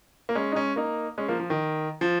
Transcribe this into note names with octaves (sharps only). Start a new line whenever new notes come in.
A#3
G#3 C#4
D#4
G#3 C#4
A#3 D#4
G#3 C#4
F3 A#3
F3
D#3
F3